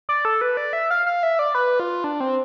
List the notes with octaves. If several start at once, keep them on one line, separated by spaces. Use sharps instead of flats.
D5
A4
B4
D5
E5
F5
F5
E5
D5
B4
F4
D4
C4